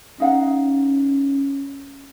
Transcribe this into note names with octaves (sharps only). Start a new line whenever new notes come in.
C#4 D#4 F5 F#5